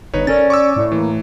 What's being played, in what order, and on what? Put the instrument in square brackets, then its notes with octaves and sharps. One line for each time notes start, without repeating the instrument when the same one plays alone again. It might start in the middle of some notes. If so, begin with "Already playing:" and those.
[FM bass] G1 [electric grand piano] D#4 B4 C#5
[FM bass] C#4 [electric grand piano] A4 A#4 A6 [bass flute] D5
[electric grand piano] C#6 D6 E6
[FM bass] A2
[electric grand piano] E3 [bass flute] A#3